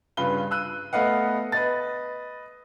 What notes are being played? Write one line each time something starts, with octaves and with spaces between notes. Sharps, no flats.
G2 C#3 F4 B4 G7
E6 F#6 D#7
A3 B3 B4 D#5 F5 F#5
B4 D#5 A6